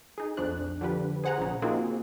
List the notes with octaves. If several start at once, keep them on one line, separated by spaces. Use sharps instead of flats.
D#4 G#4
B1 F2 D4 C5 F#6
D3 F3 G4 B4
G#4 C5 F#5 G#5 A#5
A#1 C#3
A#3 C4 D#4 F4 F#4 G#4